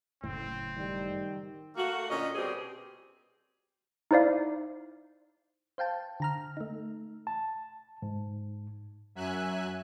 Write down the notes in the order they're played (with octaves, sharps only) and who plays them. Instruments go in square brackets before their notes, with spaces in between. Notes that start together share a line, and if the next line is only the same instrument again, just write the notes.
[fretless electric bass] F#1 A2 [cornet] C4
[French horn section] D#3 G3
[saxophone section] A3 A#3 F#4
A#2 D3 C#4 D#5
B2 G3 C4 G4 G#4
[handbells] D#4 E4 C5 D5 F5
[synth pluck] C5 F5 G5 A5
D3 A#5 F6
A3 D#4
[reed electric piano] A5
G#2
[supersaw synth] F#2 F#3 E5 G#5 F#6